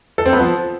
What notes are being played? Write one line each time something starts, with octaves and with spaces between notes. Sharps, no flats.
A4
C4
B3
F3